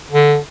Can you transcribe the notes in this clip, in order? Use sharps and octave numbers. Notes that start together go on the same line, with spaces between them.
D3